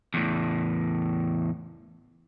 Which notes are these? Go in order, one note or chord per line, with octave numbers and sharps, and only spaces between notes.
E2 A2